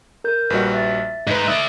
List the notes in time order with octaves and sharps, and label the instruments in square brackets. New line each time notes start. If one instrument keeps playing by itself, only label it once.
[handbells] A#4 G6
[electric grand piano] A#1 G3 F#4 [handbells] B4 D#5
[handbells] E5 A6
[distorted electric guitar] G#2 D#4 [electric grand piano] B4 D#5
[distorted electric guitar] D5 E5 [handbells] D#6